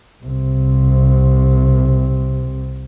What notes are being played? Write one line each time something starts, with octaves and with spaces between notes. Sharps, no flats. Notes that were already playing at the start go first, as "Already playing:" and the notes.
C2 C3